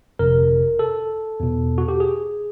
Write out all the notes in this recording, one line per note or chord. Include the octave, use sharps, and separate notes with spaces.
G1 F2 C3 A#4
A4
E2 B2
F#4
G4
G#4